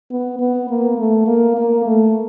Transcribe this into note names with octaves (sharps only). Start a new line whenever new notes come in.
B3
B3
A#3
A3
A#3
A#3
A3